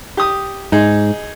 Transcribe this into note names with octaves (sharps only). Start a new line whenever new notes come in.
G4 D#6
G#2 D#4 G#4